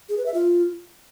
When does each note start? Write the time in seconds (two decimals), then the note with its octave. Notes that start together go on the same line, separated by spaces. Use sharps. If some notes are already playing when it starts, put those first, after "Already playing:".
0.09 G#4
0.17 B4
0.26 E5
0.34 F4